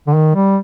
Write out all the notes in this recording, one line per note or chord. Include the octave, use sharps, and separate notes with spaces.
D3
D#3
G3